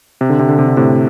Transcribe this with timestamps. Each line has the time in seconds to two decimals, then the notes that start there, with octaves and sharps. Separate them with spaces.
0.21 C3
0.30 D3
0.39 C3
0.49 D3
0.59 C3
0.68 D3
0.77 A2 C3